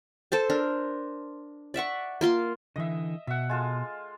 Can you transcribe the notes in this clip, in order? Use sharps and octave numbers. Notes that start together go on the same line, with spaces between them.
A4 C5 A5
D4 A#4
D5 E5 F#5 C#6
A#3 F4 C6
D3 E3 D#5 E5
B2 E5 F#5
G#3 F4 A4